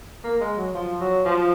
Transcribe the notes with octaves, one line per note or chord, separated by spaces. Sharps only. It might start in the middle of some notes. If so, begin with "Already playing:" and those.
A#3
G#3
F#3
F3
F#3
F3